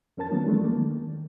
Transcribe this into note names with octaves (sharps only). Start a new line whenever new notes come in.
F2 C#4 A#4 A5 A6
D#3 F#3 A#3 B3 C#4 D4
E3 F3 G#3 A3 D4
D#2 A#3
D#3